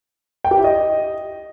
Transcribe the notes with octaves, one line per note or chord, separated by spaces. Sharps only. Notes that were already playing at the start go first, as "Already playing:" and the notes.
G5
G4
E4
D#5